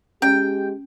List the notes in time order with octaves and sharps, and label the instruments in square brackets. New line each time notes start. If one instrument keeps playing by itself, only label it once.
[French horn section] G#3 G4 [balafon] C#4 [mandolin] G5